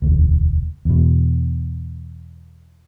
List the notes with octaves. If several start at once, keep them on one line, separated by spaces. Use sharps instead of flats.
E1 D2
E2 B2